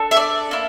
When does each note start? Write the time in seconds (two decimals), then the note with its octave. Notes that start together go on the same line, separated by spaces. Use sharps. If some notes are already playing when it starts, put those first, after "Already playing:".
Already playing: D4 A4
0.11 E5
0.17 D5
0.51 A#3 E4